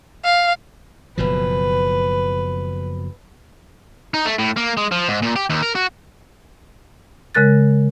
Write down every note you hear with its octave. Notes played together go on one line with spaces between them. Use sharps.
F5
F#1 B2 F3 B4
D#4
A3
A2
A#3
G#3
F3
G#2
A#2
G4
D#2
A#4
F#4
C#3 G#3 A#4 F#6 A6